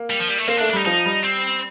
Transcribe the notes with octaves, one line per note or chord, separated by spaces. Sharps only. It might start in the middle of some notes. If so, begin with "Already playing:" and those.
Already playing: A#3
G3
F3
G3
A3
A#3 C4
A3 D4
D4
G3 D#4
F3 D#4
G3
C4